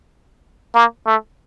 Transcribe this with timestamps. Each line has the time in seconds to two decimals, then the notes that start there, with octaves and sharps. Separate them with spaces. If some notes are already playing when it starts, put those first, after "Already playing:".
0.75 A#3
1.06 A3